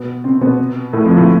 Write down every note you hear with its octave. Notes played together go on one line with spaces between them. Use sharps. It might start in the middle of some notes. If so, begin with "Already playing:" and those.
Already playing: B2 B3
C3 C4
B2 B3
A2 A3
F2 F3
A2 A3